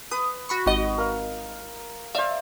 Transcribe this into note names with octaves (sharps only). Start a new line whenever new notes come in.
B4 D#6
F#4 B5 C#6
G#1 F#4 D#5
A#4 F5
C5 D5 E5 F5